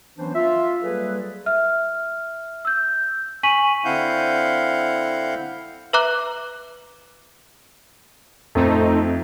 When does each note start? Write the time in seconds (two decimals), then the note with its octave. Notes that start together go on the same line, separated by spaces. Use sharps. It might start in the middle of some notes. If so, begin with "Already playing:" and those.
0.18 E3 F#3 B3 C#4 D4 C5
0.35 F4 E5
0.83 F#3 G3 A#3 G#4 A4 B4
1.46 E5 F6
2.65 E6 G6
3.43 G#5 C#6 B6 D#7 F#7
3.85 D3 C4 E4 F5 F#5 G6
5.93 B4 E5 A#5 D6 F#6
8.55 F2 A3 C4 D#4